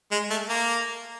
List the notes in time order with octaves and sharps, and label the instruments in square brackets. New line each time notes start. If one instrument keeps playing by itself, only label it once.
[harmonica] G#3
A3
A#3